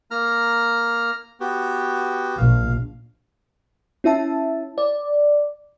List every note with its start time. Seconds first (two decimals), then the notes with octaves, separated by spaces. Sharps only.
0.11 A#3 A#5 F6
1.40 B3 F#4 G4
2.38 A#1 F5
4.04 C#4 E4 E5 A5
4.78 D5